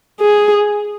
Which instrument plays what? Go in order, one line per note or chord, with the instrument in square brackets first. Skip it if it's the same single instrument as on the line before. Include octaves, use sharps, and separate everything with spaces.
[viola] G#4